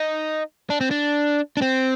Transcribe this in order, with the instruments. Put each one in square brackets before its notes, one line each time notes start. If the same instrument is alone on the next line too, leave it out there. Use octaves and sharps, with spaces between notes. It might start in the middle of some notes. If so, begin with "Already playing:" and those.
Already playing: [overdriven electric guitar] D#4
D4
C4
D4
D4
C4